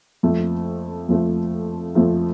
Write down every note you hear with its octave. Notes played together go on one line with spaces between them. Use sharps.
F2 F3 A3
F2 F3 A3
F2 F3 A3